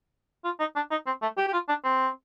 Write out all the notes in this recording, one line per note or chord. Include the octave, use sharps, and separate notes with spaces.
F4
D#4
D4
D#4
C4
A3
G4
G4
F4
D4
C4